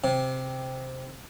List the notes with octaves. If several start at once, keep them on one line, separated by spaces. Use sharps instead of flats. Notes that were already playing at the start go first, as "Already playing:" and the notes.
C3